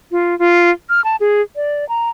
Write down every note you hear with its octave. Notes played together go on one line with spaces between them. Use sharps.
F4
F4
F6
A5
G#4
D5
A#5